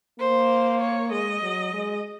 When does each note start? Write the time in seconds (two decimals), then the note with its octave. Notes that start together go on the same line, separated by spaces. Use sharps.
0.19 A#3 C5
0.80 C#5
1.11 G#3 D#5
1.43 F#3
1.74 G#3